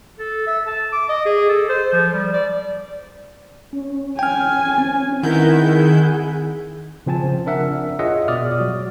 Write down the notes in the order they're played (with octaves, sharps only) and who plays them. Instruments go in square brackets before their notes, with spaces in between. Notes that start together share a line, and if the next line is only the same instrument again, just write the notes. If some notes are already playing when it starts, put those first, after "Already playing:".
[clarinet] A4
E5
A5
D6
D#5
G#4
A4
C5
F3
G3
D5
[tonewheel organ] C#4
[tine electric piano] G5 F6 [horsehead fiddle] G#5
[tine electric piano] C4
[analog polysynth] D#3 E4 G6 [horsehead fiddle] A#4 B4 [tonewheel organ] F#5 G#5
[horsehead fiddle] G#4
[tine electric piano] C#3 F3 C4 G#5 A5
D4 A#4 E5 F#5
F4 G#4 C#5 D#5 E5 F#5
B2 D5 D#6 F6
F#3 F#4